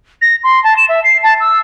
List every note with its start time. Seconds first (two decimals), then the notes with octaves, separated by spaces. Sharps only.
0.22 A#6
0.44 C6
0.64 A5
0.77 E7
0.89 E5
1.04 C7
1.23 A5
1.40 E6